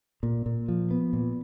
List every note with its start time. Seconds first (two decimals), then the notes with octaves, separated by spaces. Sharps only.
0.23 A#2
0.46 A#2
0.68 F3
0.91 B3
1.13 A#2